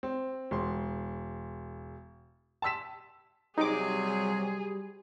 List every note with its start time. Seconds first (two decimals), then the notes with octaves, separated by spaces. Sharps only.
0.03 C4
0.51 E1 C6
2.62 A5 C6 E6 B6 E7
3.58 C3 F#3 G3 D#4 G#4 D6